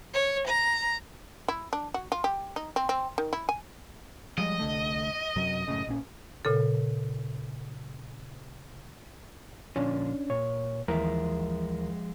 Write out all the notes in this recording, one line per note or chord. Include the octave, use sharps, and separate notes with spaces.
C#5
A#5
E4
D4
F#4
F4
G4
D#4
C4
C4
D#3
E4
G#5
F3 G3 G#3 D#5
C2 D3 A3
F#2 C3 F#3
F#2 A2 C#3
A#1 A#2 C#4
A#2 C#3 A4
A#2 D3 F3 C#4 D4
A#2 C#5
D#2 E3 F3 G#3 A#4 E5